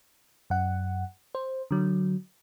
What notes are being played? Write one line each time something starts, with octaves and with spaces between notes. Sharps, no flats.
F#2 F#5
C5
D3 F#3